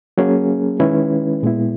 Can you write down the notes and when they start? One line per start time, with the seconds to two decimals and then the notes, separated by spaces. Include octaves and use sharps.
0.18 F#3 A#3 C#4 G#4
0.80 D#3 G#3 C#4 E4 B4
1.43 A#2 G#3 B3 E4